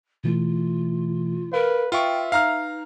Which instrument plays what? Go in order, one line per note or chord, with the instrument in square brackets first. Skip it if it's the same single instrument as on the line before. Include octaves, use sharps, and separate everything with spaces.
[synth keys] B2 E3 A3 [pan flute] F4
[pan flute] A#4 [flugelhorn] B4 [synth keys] F5
[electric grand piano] F4 C#6 [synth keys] B4 [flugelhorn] E5 [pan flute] G5
[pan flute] D#4 [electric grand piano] F5 A#5 F6